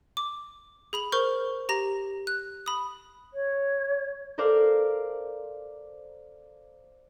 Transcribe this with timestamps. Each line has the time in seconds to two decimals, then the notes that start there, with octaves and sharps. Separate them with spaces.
0.17 D6
0.93 G#4 B5 F#7
1.12 A#4 C5 C#6 F6 G6
1.69 G4 A#5 A#6 F7
2.27 F#6
2.66 B5 D#6
3.34 C#5
4.38 A4 A#4 C5 D5 F5